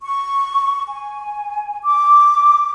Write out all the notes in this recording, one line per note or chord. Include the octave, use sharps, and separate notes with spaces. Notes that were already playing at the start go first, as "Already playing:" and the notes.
C#6
G#5
D6